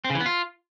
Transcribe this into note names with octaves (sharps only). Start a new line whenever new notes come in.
C4
C#3
E3
B3
F4